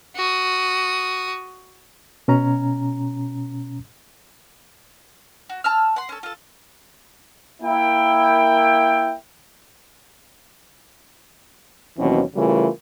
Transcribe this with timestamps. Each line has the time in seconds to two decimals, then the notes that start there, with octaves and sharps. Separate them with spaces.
0.16 F#4 D#6
2.28 B2 C#4 A#5
5.50 F#4
5.64 A5 E6 F6
5.96 F#5 C6
6.09 C#4 A4
6.23 F4 A4
7.63 A#3 E4 G5
11.98 D#2 B2 E3 F#3 C4 C#4
12.36 C#3 E3 G3 A3 F4 A#4